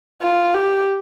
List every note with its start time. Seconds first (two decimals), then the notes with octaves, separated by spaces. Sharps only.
0.22 F4
0.54 G4